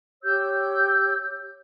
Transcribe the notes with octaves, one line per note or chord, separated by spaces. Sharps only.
G4 C#5 E6 G6